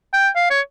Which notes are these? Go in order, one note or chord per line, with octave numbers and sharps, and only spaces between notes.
G5
F5
C#5